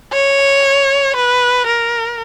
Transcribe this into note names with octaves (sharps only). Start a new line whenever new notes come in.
C#5
B4
A#4